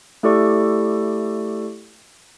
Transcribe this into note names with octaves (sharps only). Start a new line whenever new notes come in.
A3 E4 G4 A4 D5 C#6